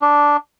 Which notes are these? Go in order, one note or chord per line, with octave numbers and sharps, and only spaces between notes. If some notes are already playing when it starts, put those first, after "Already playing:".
D4